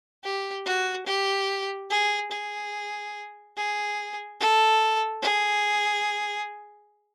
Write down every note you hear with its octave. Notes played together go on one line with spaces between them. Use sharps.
G4
F#4
G4
G#4
G#4
G#4
A4
G#4